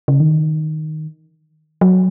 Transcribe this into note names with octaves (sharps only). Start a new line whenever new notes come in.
C#3
D#3
F#3